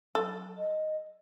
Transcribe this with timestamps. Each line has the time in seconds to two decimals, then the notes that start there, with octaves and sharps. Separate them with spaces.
0.15 F#3 A4
0.58 D#5